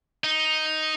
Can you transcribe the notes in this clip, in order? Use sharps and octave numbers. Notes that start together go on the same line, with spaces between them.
D#4